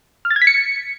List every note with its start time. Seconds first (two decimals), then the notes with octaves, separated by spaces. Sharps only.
0.25 F6
0.31 A6
0.36 G#6
0.42 B6
0.47 C#7